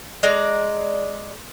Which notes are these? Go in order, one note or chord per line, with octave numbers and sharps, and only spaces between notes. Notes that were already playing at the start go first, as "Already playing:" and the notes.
G#3 D5 A#5